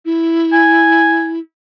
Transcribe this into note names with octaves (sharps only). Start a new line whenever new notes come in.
E4
G#5